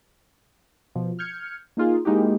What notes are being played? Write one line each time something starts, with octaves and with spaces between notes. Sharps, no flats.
B2 F3
F6 G6 G#6 C#7
A#3 D#4 F4 G#4
G#3 A#3 D#4 E4 F#4 G4